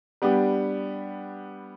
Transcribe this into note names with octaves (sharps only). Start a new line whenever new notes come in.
G3 B3 D4 G4